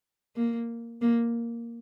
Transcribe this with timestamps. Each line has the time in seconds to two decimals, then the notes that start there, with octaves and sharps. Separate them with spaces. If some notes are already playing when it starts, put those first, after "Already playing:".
0.36 A#3
1.01 A#3